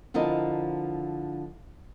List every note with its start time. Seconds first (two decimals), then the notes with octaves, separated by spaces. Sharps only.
0.14 D3 F3 E4 A#4 D#5